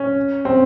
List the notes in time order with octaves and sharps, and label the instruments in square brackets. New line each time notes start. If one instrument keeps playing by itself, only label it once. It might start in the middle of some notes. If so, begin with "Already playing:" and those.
Already playing: [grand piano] C#4
C4